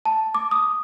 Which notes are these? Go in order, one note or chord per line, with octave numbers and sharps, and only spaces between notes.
A5
D6
D#6